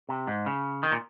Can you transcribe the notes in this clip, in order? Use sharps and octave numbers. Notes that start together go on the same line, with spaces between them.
C3
G#2
C#3
D#3
A#2